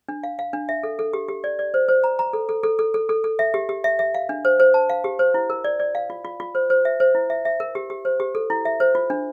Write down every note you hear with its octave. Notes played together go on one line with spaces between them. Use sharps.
D4
F5
F5
D4
E5
A4
A4
G4
G4
D5
D5
C5
C5
A#5
A#5
A4
A4
A4
A4
A4
A4
A4
E5
G4
G4
E5
E5
F5
D4
C5
C5
A5
F5
G4
C5
E4
A#4
D5
D5
F5
F4
F4
F4
C5
C5
E5
C5
E4
E5
E5
A#4
G4
G4
C5
G4
A4
E4
E5
C5
F4
D4